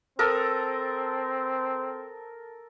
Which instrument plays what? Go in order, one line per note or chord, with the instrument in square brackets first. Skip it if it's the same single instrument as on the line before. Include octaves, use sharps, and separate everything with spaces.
[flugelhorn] C4 [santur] A4 A#4 D#6